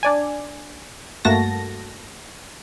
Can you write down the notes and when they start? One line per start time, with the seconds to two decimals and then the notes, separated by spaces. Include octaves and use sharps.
0.03 D4 D5 G#5
1.25 G2 A3 A#3 F#4 A5 A#6